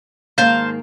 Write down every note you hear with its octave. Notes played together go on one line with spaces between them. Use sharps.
G#2 D#3 A#3 C5 F5 A5